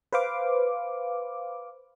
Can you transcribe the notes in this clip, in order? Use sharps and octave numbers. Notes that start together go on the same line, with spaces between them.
B4 C5 F5 D6